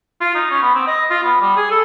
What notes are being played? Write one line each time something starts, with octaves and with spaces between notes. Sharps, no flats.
F4
D#4
C#4
B3
C4
D#5
F4
B3
G3
G#4
A4